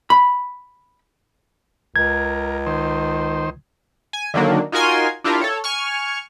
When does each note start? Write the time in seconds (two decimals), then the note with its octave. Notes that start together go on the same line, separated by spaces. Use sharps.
0.10 B5
1.96 C#2 A#4 G#6
2.66 D#3 C5
4.13 G#5
4.34 D3 D#3 F#3 A#3 D4
4.72 D#4 F4 F#4 A#4 G#5 C6
5.24 D4 E4 F4 G4 A#4
5.41 A4 C#5
5.64 G#5 C#6 F6